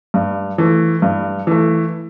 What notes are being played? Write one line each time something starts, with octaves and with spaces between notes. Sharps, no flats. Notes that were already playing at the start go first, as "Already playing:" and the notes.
G2
E3 A3
G2
E3 A3